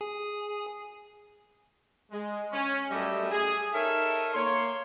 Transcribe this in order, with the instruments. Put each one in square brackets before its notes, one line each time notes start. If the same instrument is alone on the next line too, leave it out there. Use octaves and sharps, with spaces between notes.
[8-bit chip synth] G#4
[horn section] G#3
C#4
F#2 G3 A3 G4 D#5 E5
G#4
D#4 A4 A#4 C#5 E5
A#3 C#5 C6